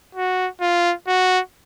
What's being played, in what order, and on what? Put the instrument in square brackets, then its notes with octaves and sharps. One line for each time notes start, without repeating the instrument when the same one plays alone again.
[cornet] F#4
F4
F#4